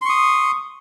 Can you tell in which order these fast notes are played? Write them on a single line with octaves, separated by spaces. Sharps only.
C6 C#6 D#6